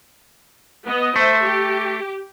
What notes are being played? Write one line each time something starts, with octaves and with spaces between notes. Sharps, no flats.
B3 D#5
A3 C5 E5
G4